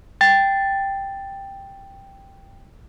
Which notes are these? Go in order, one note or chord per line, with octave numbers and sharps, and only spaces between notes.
G5 A6